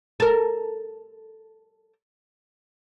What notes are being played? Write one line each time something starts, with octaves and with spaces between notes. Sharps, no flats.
A4 A#4